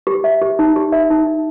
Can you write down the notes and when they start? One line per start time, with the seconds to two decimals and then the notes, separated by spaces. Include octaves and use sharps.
0.07 G4
0.24 E5
0.42 G4
0.59 D#4
0.76 G4
0.92 E5
1.10 D#4
1.27 D#4